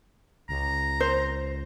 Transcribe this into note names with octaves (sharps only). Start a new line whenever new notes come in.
C#2 A#5
C5